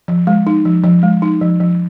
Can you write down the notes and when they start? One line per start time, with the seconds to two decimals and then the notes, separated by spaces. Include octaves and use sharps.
0.08 F3
0.27 G#3
0.47 D#4
0.65 F3
0.84 F3
1.03 G#3
1.22 D#4
1.41 F3
1.60 F3